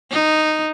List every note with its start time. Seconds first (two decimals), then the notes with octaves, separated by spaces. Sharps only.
0.12 D#4